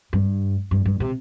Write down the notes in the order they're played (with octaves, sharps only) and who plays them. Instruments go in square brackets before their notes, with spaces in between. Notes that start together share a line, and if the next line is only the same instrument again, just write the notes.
[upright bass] G2
G2
G2
C3